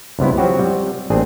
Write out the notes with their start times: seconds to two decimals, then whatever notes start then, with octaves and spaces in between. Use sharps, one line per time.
0.19 C#2 G2 C3 B3 E4
0.38 F3 F#3 C4 F#4 G4
0.59 C3 G3
1.10 A1 A#2 C4 D4 G#4